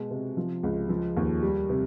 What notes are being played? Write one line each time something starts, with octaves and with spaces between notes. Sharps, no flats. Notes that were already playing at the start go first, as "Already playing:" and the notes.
Already playing: B2 G#3
C3
F3
C#2
F3
D#2
G3
C3